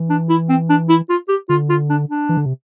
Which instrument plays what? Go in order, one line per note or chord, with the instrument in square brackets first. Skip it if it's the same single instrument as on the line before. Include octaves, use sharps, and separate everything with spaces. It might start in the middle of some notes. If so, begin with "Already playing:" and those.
Already playing: [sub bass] E3
[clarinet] D4
E4
C4
D4
E4
F4
G4
[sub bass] D3 [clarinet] F4
[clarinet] F4
D4
D4
[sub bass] E3
D3
C3